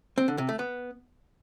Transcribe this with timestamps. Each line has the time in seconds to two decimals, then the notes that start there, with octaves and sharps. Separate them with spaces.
0.18 C4
0.28 D3
0.38 C3
0.49 A3
0.59 B3